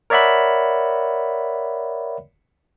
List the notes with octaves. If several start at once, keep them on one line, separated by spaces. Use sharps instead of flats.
A#4 C#5 D5 E5 F#5 B5